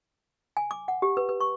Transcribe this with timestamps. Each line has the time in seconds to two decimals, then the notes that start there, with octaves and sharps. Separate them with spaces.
0.57 G#5
0.71 D6
0.88 F#5
1.02 G4
1.17 B4
1.29 B4
1.41 C#6